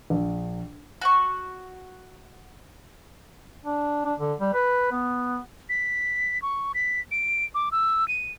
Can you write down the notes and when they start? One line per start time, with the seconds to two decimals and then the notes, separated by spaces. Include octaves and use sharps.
0.10 A#1
1.01 F#4 F#5 C#6
3.65 D4
4.05 D4
4.19 D3
4.40 G3
4.54 B4
4.92 B3
5.69 B6
6.42 C#6
6.74 B6
7.11 D7
7.55 D6
7.72 E6
8.08 D#7